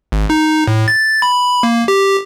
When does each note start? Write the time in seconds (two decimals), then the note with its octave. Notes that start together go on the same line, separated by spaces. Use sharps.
0.12 G#1
0.30 D#4
0.67 A2
0.88 A6
1.22 B5
1.63 A#3
1.88 G4